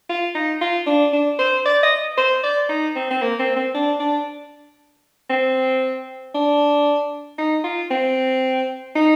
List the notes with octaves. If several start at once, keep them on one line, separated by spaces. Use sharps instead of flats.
F4
D#4
F4
D4
D4
C5
D5
D#5
C5
D5
D#4
C4
C4
A#3
C4
C4
D4
D4
C4
D4
D#4
F4
C4
D#4